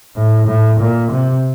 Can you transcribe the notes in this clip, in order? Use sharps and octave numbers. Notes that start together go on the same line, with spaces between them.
A2
A2
A#2
C3